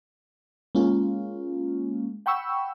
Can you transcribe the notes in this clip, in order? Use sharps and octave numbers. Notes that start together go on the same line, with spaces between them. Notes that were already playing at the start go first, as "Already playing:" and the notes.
G#3 A#3 C#4 F4
F#5 G5 B5 C#6 E6